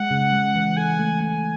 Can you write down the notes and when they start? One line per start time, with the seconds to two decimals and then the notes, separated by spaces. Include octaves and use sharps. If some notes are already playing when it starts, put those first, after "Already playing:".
Already playing: G#3 F#5
0.11 C#3
0.33 G#3
0.56 E3
0.77 A4 G#5
0.99 A3
1.21 A3 G#5